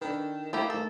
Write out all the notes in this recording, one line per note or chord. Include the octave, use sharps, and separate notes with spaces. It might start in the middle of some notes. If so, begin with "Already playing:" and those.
D#3 D4 A4 B4
A3 A#3 D#4 E4 G4 A4 A5
A3 D#4 A4